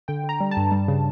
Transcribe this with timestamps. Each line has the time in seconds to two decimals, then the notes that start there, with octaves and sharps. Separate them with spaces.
0.08 D3 G5
0.24 D3
0.29 A#5
0.40 G3
0.51 A5
0.57 G2
0.72 G3
0.88 C#3